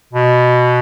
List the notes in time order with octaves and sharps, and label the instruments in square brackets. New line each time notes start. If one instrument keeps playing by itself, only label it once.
[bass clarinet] B2